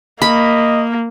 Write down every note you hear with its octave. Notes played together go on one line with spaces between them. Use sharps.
A#3 D#5 B5